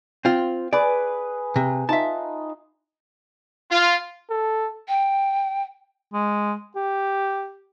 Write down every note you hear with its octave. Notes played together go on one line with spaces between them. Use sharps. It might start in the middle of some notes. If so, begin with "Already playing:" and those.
C4 F4
G#4 B4 D5
C3
D#4 F4 E5 A5
F4
A4
G5
G#3
G4